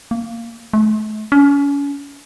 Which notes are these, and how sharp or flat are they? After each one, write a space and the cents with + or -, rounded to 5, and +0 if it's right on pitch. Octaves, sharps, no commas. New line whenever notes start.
A#3 -15
A3 -40
C#4 +35